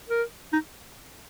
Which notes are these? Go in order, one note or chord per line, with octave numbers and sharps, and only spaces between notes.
A#4
D#4